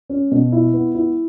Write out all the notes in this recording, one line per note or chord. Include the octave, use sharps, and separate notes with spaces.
C#4
B2
E4
B3
E4